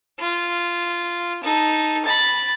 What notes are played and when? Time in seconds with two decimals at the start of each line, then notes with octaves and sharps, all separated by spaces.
0.19 F4
1.44 D#4 A4
2.05 B5 A6